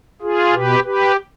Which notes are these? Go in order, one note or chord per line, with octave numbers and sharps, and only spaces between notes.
F4 G#4
B2 G4 B4
G4 B4